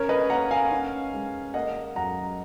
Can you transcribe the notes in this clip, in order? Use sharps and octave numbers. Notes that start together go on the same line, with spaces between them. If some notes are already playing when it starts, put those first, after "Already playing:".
Already playing: C#4 A#4 C#5
B4 D#5
A#3 F#5 A#5
F5 G#5
C#4
G#3
A#3 D#5 F#5
F#2 F#5 A#5